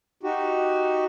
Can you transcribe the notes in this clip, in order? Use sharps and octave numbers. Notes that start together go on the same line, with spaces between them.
D#4 F#4 G4